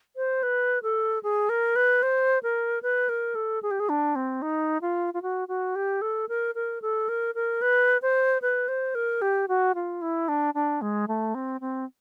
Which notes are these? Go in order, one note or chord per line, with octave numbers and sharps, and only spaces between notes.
C5
B4
A4
G#4
A#4
B4
C5
A#4
B4
A#4
A4
G#4
G4
G#4
D4
C4
D#4
F4
F4
F#4
F#4
G4
A4
A#4
A#4
A4
A#4
A#4
B4
C5
B4
C5
A#4
G4
F#4
F4
E4
D4
D4
G#3
A3
C4
C4